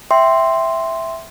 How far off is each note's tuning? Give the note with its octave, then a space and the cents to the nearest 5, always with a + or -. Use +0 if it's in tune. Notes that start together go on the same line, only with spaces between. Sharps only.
E5 +0 G5 +0 C6 +0